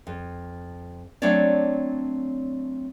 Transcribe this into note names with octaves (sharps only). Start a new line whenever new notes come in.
F2
F#3 A3 C4 D4 C#5 D5